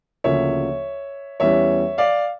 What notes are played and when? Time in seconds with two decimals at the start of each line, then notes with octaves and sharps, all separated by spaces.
0.24 D2 C#3 F3 A#3 C#4 C#5 E5
1.40 E2 E3 G3 C#4 C#5 E5
1.98 D5 F5